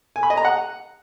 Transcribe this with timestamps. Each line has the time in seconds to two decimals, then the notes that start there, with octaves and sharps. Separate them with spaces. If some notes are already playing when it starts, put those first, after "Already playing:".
0.16 G#5
0.23 B5
0.30 D#5
0.37 A#5
0.45 F#5